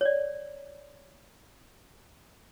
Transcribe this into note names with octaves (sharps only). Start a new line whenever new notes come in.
C#5 D5